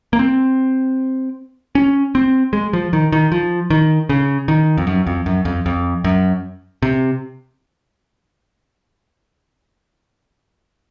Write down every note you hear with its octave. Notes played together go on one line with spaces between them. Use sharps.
A#3
C4
C#4
C4
G#3
F3
D#3
D#3
F3
D#3
C#3
D#3
F2
F#2
F2
F#2
F2
F2
F#2
C3